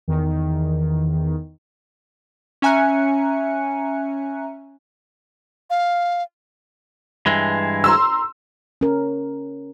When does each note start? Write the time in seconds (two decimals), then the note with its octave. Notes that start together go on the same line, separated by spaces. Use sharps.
0.08 E2 D#3
2.62 C#4 E5 G#5 A#5 F#6 C#7
5.70 F5
7.26 G2 E3 G#3
7.84 A#5 C6 E6
8.81 C#4 A#4